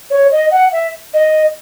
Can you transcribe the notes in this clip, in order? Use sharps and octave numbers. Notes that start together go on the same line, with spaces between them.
C#5
D#5
F#5
E5
D#5